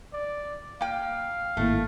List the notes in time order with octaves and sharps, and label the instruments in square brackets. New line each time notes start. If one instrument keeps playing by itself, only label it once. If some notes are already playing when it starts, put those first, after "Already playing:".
[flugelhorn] D5
[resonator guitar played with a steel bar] A#3 G5 [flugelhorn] F5
[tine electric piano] G#1 A2 E4 [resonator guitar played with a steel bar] A3 [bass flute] A#3